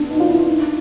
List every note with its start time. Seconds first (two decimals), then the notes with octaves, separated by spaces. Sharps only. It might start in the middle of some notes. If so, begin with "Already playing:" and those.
Already playing: B3 D4
0.11 D#4
0.20 F4
0.29 E4
0.47 D#4